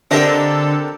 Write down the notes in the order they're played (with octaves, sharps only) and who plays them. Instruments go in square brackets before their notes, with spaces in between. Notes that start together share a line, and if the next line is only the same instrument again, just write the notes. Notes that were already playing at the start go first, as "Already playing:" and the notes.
[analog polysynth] D3 A4 [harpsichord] C4 G4 A#4 [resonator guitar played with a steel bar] D4 D#5